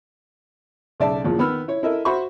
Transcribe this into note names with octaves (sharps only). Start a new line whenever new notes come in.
B1 C#3 D5 E5 A5
E2 A#2 C#3 F3
D#3 B3 B5 E6 F6
E4 C#5
E4 A4 A#4 D#5 E5
F#4 C5 E5 B5 C#6